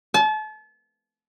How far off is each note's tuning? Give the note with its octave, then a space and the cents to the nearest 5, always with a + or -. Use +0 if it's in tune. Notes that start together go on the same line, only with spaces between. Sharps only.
A5 -35